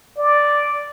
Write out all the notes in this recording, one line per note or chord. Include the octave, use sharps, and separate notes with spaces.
D5